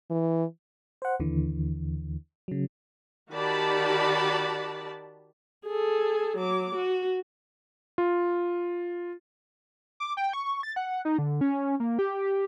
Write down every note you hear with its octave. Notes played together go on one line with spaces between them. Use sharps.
E3
C5 F#5
D#2 D3 E3
C#3 F#3
D#3 F#4 G4 D5 A5 B5
G#4 A4
F#3 D6
F#4
F4
D6
G5
C#6
A6
F#5
D#4
D3
C#4
A#3
G4